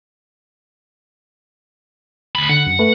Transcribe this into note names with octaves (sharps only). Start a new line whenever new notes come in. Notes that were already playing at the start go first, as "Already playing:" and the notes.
D2 B5
D3 F#5
F#2
A3 B4